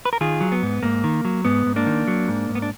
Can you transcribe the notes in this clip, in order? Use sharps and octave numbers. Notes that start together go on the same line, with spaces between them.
B4
A#4
D#3 F4 G#4
F#3
B3
G#2
G#2 A#3
D#3
F#3
G#2 B3
G#2
A#3 D4
D#3
F#3
G#2
G#2
B3
D4